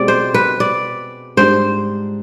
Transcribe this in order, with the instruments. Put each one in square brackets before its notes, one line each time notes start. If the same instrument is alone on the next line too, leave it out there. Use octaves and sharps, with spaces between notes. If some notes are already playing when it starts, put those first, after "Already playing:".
Already playing: [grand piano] B2 G#3 C4 G4 [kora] D5
[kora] C5
B4
D5
[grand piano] G#2 G3 D4 [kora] C5